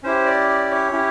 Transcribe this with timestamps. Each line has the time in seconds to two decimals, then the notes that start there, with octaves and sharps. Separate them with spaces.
0.03 C#4 E4 G4 C5
0.26 D5
0.49 D5
0.71 C#5
0.92 C#4 E4 G4